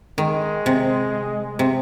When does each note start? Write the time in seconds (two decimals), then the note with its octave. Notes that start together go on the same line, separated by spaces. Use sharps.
0.18 D#3 G#3
0.66 C3
1.59 C3